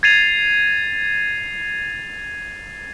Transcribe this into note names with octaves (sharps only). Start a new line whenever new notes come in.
G#6 A6 C7 D#7 F7